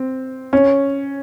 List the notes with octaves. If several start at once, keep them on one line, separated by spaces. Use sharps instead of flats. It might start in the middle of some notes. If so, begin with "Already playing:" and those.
Already playing: C4
C#4